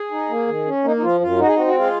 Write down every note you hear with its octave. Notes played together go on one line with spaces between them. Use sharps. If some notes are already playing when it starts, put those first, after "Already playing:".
Already playing: G#4
D#4
A#3
D#3
C#4
A#3 D#4
D#4
F3 F4
F#2 F4
D#4 F#4
G#4
C4 F#4
F#4
G#3 F4